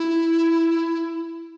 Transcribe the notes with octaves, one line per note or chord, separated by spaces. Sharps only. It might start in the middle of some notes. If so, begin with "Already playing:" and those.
Already playing: E4